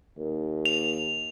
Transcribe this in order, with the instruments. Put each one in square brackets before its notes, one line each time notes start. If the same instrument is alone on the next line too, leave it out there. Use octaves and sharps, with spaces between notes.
[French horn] D#2
[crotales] F7